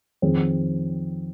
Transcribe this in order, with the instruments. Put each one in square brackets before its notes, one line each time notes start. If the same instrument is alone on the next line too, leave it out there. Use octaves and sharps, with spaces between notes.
[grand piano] F2 D#3 C4 G#4